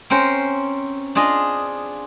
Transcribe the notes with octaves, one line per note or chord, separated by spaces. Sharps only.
C4 C#4 A#4 C5
D4 F4 G#4 D#5